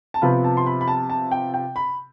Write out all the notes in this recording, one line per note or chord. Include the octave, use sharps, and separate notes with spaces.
A5
C3 F3 B3 F4 B5
A5
C6
B5
B5
A5
A5
G5
G5
B5